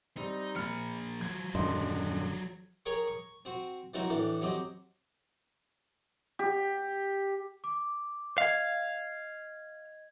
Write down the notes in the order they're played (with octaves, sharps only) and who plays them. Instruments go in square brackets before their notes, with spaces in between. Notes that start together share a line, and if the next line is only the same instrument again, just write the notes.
[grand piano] G3 C4 [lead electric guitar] D#4
[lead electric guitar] F3 A#3 [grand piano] B5 F6 C#7
[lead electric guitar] F3 F#3 [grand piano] G#6
[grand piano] D#1 D#5 C6 [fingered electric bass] F#2 D3
[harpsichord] G#4 A#4 C#5 G5 C#6
C#6
C4 F#4
E3 F#3 C4 D#4 F#4
A2 E3 D4
F#3 C4 G4 D#5
[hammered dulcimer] G4
[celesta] D6
[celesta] D#5 G#6 [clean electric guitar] F5